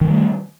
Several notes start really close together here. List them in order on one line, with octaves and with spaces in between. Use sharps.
D#3 E3 G3 A3